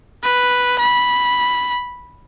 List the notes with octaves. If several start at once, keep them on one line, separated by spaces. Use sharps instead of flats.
B4
B5